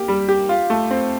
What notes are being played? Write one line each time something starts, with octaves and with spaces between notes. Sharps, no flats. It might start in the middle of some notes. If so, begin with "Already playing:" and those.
Already playing: A#3 G4
G3
G4
F4
A3
C4